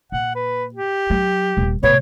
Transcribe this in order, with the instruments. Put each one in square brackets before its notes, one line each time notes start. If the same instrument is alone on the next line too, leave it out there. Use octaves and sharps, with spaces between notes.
[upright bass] A#2 [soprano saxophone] F#5
[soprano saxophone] B4
G4
[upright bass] F#3
D#1 A#2
[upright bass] A2 C3 [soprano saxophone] B3 [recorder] C#5